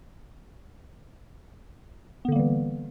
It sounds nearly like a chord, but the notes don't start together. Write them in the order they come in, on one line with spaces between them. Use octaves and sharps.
B3 D3 A#3 G3 E3